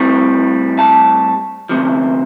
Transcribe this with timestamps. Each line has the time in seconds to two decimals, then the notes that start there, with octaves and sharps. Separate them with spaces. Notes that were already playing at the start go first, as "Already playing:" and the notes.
Already playing: A2 G3 C4
0.79 A5
1.69 D2 C3 F3